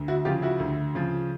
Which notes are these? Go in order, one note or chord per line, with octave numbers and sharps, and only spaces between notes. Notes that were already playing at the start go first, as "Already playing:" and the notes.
Already playing: D2
E4 F#4
C#3 F3 F4 G4
E4 F#4
D2
C#3 F3